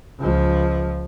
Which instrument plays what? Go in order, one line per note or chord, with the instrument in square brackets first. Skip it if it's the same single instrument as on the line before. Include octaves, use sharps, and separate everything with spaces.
[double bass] C#2 F3